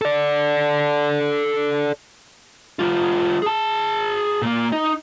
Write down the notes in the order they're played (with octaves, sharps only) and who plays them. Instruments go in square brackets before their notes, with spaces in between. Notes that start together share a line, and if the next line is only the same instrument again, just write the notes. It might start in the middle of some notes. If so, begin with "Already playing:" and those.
[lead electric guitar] A4 D5
G3 F4
G#4 A5
A#2 A#3
D#4